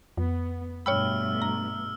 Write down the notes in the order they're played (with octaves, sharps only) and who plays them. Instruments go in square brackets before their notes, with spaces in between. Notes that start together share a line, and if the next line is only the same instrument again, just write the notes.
[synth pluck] F2 [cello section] B3
[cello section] G2 B2 A3 [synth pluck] C#5 G5 B5 [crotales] E6 F6
[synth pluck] A#5